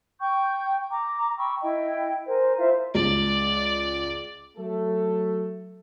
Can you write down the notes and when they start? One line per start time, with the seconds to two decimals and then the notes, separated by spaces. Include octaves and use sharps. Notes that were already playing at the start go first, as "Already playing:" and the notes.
0.20 G5 C#6 G6
0.90 A#5 D6
1.37 G5 B5 C#6 E6
1.63 E4 D#5 G5
2.27 A#4 C5 G#5
2.58 E4 F4 C5 E5
2.95 C#2 D5
4.57 F#3 A3 A4